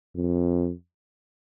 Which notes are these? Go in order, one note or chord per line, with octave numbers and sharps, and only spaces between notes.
F2